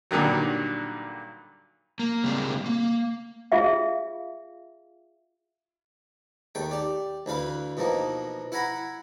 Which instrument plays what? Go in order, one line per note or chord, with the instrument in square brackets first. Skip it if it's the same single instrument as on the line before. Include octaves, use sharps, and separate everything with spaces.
[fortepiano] G2 A#2 D3 D#3 F#3
[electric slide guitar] A#3
C#3 G3 G#3 A#3 C4
A#3
[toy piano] F4 G#4 E5 F5
[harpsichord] D#2 A3 G5
G4 D5
D2 E3 B4 F5
B2 E3 F3 A#3 D#4
E4 F#5 G#5 A#5 B5